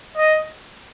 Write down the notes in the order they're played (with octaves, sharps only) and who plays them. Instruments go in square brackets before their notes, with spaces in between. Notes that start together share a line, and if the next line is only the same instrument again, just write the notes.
[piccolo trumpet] D#5